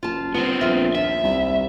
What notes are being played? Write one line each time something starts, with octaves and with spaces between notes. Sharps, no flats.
F#1 F4 A5
G1 B3 C4 F4
A#1 F4 A#4 E5
D#2 E5
C2